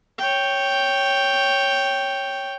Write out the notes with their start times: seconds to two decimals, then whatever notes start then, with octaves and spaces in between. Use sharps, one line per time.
0.19 C#5 G5